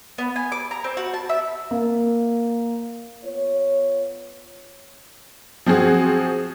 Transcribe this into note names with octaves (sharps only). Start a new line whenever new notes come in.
B3
G#5
D6
A#5
C4
F#4
A5
E5
A#3
B3 F4 C#5
F3 C4 F#4 G#4